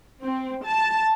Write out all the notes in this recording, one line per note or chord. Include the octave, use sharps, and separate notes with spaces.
C4
A5